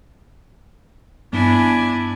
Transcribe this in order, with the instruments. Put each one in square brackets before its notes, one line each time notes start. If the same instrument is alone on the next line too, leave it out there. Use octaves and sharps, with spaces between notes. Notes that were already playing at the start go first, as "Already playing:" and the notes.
[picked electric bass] G2 B3 [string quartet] D4 E4 G#5